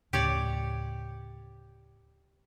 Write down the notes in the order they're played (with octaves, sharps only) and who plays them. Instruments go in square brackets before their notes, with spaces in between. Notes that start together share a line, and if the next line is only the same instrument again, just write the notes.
[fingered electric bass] D2 A2 C#3 [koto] G4 C#5 D5